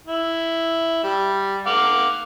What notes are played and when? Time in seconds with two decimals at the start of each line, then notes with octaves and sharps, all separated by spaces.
0.07 E4
1.04 G3
1.66 F5 F#5 D6